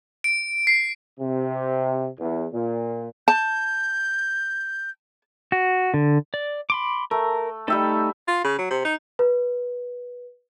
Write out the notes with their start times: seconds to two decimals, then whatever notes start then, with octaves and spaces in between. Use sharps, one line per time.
0.24 D7
0.67 C7
1.20 C3
2.19 E2
2.53 A#2
3.28 A5 G6
5.52 F#4
5.94 D3
6.34 D5
6.70 B5 C6 D6
7.11 A3 A#4
7.68 G3 A3 D#4 A4 E5 G5
8.28 F4
8.44 C#3
8.58 F#3
8.71 C3
8.85 D#4
9.19 B4